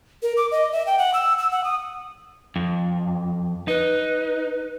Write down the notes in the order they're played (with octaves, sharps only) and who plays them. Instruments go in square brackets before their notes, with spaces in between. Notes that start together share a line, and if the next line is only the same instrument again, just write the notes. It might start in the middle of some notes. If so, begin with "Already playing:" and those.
[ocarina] A#4
D6
D#5
E5
G5
F#5
E6
E6
F#5
D#6
[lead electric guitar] F2
[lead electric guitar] D#4 [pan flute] B4